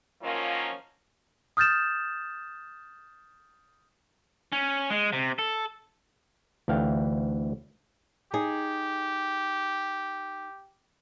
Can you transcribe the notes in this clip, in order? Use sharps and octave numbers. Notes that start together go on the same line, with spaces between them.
D#3 F3 F#3 A#3 C#4 F4
D#6 F6 G6 A6 E7
C#4
G#3
C3
A4
D2 E3 F5 G5
D#4 G4 G#4